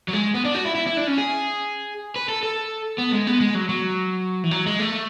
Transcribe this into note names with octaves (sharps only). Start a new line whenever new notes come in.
F#3
G#3
B3
D4
F#4
E4
E4
E4
D4
C#4
G#4
B4
A4
A4
B3
G#3
B3
G#3
F#3
F#3
E3
F#3
G#3
A3